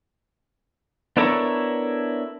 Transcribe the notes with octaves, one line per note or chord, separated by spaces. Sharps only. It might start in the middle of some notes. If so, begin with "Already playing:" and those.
B3 D4 E4 A4 A#4 C#5